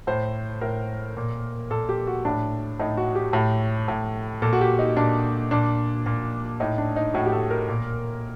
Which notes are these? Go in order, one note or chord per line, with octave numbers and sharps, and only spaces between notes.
A2 C5
A2 A#4
A#2
A#2 A4
G4
F#4
A2 D4
A2 D#4
F#4
G4
A2
A2
A#2 A4
F#4
G4
D#4
A#2 D4
A#2 D4
A#2
A2 D#4
D4
D#4
A2 F#4
G4
A4
A#4
A#2